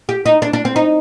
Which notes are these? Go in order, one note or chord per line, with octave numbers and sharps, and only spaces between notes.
G4
D#4
D4
D4
C4
D#4